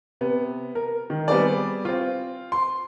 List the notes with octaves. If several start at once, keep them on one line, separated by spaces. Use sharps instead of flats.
C3 B3
A#4
D#3
G3 B3 C4 G#4 D5
C4 F4
C6